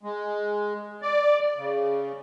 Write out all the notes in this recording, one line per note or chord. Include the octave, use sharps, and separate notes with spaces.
G#3
D5
C#3